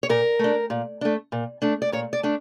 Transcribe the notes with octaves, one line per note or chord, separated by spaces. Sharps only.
C#5
A#2 A#4
A3 D4
A#2
A3 D4
A#2
A3 D4
D5
A#2 C#5
D5
A3 D4